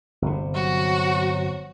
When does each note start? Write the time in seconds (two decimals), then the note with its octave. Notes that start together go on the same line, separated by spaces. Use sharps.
0.22 G1 C3
0.55 F#3 F#4